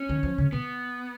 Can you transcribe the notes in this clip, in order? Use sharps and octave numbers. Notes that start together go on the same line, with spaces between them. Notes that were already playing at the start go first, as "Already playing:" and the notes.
Already playing: C#4
D#3
F3
C#3
B2 B3